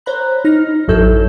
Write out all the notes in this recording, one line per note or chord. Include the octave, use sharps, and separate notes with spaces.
C5 C#5 A#5 B5 F#6
D#4 F6 A#6
A1 F#2 F#3 A4 G6